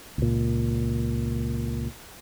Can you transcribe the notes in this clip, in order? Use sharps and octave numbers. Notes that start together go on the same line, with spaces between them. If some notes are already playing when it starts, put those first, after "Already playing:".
C#2 A#2